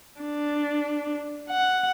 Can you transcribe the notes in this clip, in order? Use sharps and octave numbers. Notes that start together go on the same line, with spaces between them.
D4
F#5